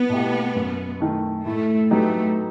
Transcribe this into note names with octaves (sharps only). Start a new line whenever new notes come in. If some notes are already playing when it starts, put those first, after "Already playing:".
Already playing: C2 B3
B2 A3 E4 G4
F#2
D#3 A3
A2 A3
F#3 A3 B3 D#4 G4